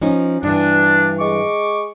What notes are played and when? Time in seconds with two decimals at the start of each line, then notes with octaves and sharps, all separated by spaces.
0.02 F3 C#4 D#4
0.43 G2 E3 D4
1.19 G#3 C#6 D6